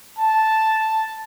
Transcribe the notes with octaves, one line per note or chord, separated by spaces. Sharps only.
A5